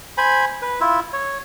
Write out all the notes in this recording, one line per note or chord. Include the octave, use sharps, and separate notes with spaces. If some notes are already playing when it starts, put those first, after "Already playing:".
C5 G#5 B5
B4
E4 F4
C#5